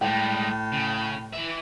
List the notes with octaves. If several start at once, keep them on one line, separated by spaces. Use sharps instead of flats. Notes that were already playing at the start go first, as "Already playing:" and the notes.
A2 G3 G#3 G5
C#3
E3 E5